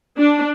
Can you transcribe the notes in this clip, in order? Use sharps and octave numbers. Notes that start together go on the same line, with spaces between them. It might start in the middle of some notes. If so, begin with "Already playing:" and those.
D4